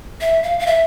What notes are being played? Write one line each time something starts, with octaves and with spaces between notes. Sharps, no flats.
E5
F5
F5
E5